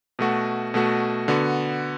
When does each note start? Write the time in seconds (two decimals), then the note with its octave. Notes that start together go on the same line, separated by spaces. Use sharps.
0.19 B2 A3 F#4
0.74 B2 A3 F#4
1.28 D3 B3 F#4